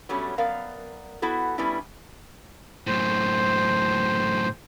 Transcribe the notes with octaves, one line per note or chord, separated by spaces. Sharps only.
F#3 G3 A3 B3 C#4
F#2 B3 A#4 D5 F5
B3 E4 F#4 A4
G3 B3 C#4 D4 E4
F#2 A2 C5